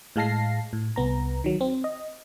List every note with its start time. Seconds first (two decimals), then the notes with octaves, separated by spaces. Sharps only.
0.16 A2 G#3 F5 A5 A#6 C7
0.73 A2
0.96 C2 B3 A#5
1.44 D#3 F#3
1.61 C4
1.84 D#5